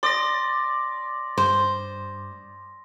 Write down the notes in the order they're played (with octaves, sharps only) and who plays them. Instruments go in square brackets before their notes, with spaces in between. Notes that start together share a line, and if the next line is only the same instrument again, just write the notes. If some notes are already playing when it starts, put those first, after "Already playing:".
[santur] D5 [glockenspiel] C6 D#6 A#6
[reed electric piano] G2 [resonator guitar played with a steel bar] C5